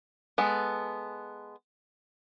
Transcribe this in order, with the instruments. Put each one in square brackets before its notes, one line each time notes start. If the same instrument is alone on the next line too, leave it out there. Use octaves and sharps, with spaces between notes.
[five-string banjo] G#3 B3 A4